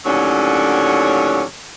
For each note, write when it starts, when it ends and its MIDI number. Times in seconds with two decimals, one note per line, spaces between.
0.05 1.43 39
0.05 1.43 45
0.05 1.43 50
0.05 1.43 54
0.05 1.43 61